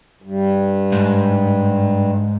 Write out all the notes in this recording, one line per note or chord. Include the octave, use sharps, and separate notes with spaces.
G2
G#2